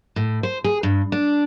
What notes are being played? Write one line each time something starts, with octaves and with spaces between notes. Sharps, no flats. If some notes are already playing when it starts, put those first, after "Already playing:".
A2
C5
G#4
G2
D4